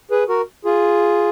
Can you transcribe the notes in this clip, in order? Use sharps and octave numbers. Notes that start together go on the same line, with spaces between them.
G#4 B4
F#4 A#4
F4 G#4